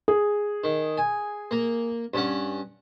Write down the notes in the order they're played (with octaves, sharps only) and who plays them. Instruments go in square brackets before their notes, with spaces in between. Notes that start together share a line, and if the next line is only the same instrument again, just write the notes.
[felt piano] G#4
[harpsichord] D#3
G#5
A#3 A#5
G2 C#4 F#5